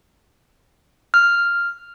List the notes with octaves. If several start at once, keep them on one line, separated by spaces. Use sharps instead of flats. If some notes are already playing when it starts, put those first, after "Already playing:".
F6